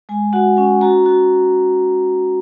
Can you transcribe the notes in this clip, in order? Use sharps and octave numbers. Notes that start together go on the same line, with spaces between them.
G#3 G#5
F#4 F#5
C#4 G#5
F#4 A#5
F#4